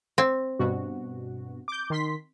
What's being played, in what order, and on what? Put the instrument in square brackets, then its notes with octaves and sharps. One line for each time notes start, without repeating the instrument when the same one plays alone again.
[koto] C4
[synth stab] G2 B2 F#4
D6 G6
D#3 C6 B6